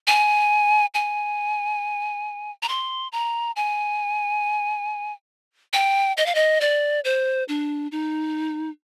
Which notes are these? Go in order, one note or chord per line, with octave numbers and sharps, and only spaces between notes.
G#5
G#5
A#5
C6
A#5
G#5
G5
D#5
F5
D#5
D5
C5
D4
D#4